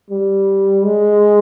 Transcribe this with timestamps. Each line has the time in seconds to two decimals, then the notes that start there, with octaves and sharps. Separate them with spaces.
0.10 G3
0.84 G#3